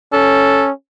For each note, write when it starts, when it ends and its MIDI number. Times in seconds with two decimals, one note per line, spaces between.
0.13 0.71 61
0.13 0.66 69